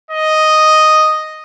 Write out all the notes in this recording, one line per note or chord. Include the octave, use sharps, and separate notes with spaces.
D#5